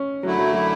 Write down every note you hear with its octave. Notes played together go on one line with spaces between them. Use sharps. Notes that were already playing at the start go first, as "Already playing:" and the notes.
Already playing: C#4
F#2 D3 F#3 A3 E4
F#3
F#3